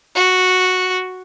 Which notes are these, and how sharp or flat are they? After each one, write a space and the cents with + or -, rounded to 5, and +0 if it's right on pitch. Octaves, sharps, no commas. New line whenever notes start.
F#4 -5